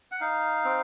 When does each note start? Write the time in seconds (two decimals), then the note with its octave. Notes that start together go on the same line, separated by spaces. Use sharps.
0.12 F#5
0.21 D#4 F5
0.65 C4